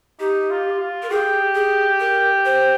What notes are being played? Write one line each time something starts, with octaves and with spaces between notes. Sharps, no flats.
D#4 G4
F4
F4
A#4
G4 G#4
G#4
A#4
C5